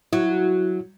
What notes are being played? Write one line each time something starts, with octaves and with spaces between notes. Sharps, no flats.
F#3 E4